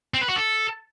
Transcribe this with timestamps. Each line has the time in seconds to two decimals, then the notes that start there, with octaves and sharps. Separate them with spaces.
0.14 C4
0.21 B4
0.29 F#4
0.36 A4